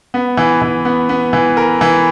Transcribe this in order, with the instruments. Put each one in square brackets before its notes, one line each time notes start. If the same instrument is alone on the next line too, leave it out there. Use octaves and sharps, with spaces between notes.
[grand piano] B3
E3
E3
B3
B3
E3
A#4
E3